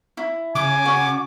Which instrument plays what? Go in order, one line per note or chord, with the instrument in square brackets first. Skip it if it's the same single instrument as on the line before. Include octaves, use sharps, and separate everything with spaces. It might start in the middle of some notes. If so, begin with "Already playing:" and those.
[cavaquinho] E4
[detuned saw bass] C#3 [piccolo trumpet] G#5 [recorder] D6
[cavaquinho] F#4 D5